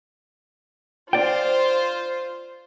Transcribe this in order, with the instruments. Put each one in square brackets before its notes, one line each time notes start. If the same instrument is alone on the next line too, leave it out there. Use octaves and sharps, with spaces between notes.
[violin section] F4 C5 [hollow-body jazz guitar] D5 G5